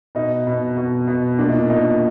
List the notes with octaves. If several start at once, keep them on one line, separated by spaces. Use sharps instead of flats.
B2 D#4
B2
B2
B2
A#2 D4
D#4
D4
A#2 D#4